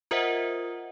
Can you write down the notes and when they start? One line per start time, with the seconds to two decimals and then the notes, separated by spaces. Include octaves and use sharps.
0.11 F4 A#4 C5 D#5 E5 F#5